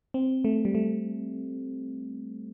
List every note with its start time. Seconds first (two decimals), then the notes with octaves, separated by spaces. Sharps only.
0.14 C4
0.45 A3
0.65 G3
0.75 A3